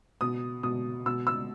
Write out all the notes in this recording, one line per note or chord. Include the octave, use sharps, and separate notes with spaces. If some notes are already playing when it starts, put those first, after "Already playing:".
B2 D#6
B2 D#6
B2 E6
E6